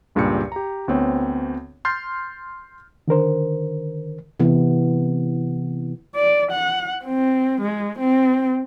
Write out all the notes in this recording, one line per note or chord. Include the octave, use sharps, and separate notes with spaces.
C#2 G2 A#2 C#3 G4 C#7
G4 A#5
D2 B3 C4 C#5
C6 F6 G6 A6 C7
D3 D#3 A#4 C5
C3 E3 B3
D5
F#5
C4
G#3
C4